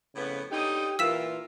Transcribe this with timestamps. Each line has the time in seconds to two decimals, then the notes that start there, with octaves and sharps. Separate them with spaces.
0.15 F2 A2 C#3 B3
0.51 D3 C#4 D#4 G4 G5 D#6
0.99 A#2 E3 F4 A#4 E6 B6 E7